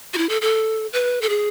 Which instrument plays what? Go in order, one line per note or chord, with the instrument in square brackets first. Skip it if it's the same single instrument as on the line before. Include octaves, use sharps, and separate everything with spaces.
[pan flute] F#4
E4
A4
A4
B4
A4
G#4